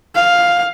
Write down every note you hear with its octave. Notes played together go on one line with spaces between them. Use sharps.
F5